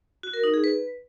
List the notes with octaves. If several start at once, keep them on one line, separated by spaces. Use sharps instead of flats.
F#4
A#4
D#4
G#4
B4